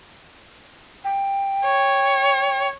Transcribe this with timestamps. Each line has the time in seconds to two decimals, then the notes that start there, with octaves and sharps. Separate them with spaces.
1.05 G5
1.64 C#5